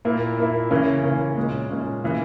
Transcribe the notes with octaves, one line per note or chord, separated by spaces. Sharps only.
A#2 A#3 E4
A#2 A#3 E4
C#3 E3 A#3 C#4
C#3 E3 A#3 C#4
A#2 G#3 C#4
A#2 G#3 C#4
C#3 E3 A#3